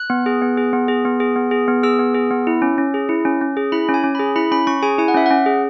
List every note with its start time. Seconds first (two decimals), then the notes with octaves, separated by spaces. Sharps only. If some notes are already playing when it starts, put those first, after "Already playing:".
Already playing: F#6
0.10 B3
0.26 G#4
0.42 B3
0.57 G#4
0.73 B3
0.88 G#4
1.05 B3
1.20 G#4
1.36 B3
1.51 G#4
1.68 B3
1.83 G#4 E6
1.99 B3
2.14 G#4
2.31 B3
2.47 E4
2.62 C#4
2.78 C#4
2.94 G#4
3.09 E4
3.25 C#4
3.41 C#4
3.57 G#4
3.72 E4 B5
3.89 C#4
3.94 G#5
4.04 C#4
4.15 G#4 B5
4.36 E4 B5
4.51 C#4 B5
4.67 C#4 C#6
4.83 G#4 G#5
4.98 E4 G#5
5.08 F#5
5.14 C#4 E5
5.26 C#4 F#5
5.46 G#4